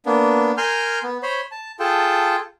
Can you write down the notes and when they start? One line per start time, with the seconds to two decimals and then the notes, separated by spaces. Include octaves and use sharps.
0.06 A#3 B3 D4
0.58 A#4 G#5 C6 F6 G6
1.03 B3
1.23 C5 C#5 B5 C6
1.51 A5
1.80 F4 G#4 A4 G5 A5